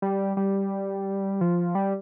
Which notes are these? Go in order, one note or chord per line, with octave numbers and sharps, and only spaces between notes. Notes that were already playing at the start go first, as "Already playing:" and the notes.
G3
G3
F3
G3